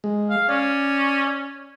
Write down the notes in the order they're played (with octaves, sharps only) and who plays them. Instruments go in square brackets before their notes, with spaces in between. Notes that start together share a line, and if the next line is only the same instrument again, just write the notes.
[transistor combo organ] G#3
[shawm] F5
[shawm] C#4 [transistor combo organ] D5